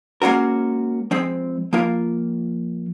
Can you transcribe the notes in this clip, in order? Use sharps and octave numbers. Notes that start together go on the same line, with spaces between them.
G#3 A#3 C#4 F#4 A#4
F3 G#3 C4
F3 A#3 F4 A#4